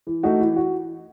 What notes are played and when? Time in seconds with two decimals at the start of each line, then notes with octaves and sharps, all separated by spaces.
0.07 E3
0.23 A3 D#4 F#4
0.40 E3
0.56 F#4